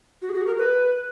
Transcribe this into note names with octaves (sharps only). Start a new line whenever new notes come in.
F#4
G#4
F#4
G#4
A#4
B4